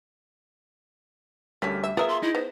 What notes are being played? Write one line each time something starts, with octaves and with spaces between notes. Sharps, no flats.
D2 G3 A3 A#3 C#4 B6
E5
B3 F4 G#4 A#4 E5 D#6
C6
D#4 E4
B3 C5